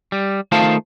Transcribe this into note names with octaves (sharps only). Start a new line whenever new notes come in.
G3
D#3 A3 F4 C5 F5 A5